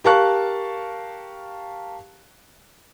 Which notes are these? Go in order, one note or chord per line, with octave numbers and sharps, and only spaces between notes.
G4 A#4 F5 A5 C#6 F#6